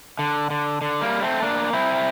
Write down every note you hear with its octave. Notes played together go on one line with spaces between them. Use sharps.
D3
D3
D3
G3 A#3
A3 C4
A#3 D4
C4 E4